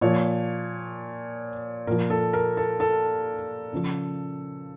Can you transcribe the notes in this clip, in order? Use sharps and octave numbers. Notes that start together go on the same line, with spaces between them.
A#2 F3 C#5
A#2 F3 A#4
A4
A#4
A4
A4
C#3 F3